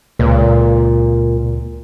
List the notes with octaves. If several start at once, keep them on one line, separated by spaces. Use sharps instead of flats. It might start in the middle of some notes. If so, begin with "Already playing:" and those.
C#2 A#2